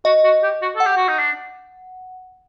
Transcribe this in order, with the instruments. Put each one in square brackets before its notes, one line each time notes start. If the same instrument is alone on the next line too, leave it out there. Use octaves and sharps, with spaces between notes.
[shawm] F#4 [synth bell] D#5
[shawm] F#4
G4
F#4
[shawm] A4 [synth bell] F#5
[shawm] G4
F#4
D#4
D4